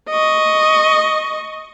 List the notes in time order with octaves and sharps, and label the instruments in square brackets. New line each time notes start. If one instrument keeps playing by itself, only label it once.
[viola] D#5 C#6